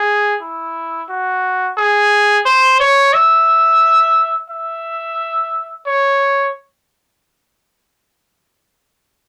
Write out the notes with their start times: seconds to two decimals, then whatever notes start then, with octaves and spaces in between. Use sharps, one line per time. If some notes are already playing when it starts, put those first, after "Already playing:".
Already playing: G#4
0.42 E4
1.10 F#4
1.78 G#4
2.46 C5
2.80 C#5
3.14 E5
4.50 E5
5.86 C#5